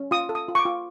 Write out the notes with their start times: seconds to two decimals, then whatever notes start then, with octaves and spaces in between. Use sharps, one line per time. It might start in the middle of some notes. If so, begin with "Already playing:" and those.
Already playing: C#4
0.11 F4 D#6
0.29 A4
0.35 D#6
0.48 F4
0.55 C#6
0.59 D6
0.65 F4